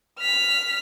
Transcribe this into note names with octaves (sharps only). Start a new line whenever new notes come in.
F6 B6